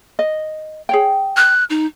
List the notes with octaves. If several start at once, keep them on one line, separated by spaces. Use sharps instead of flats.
D#5
G#4 C#5 G5
F#6
D#4